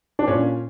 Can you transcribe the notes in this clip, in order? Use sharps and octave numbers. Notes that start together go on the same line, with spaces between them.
D4
A#2 C#4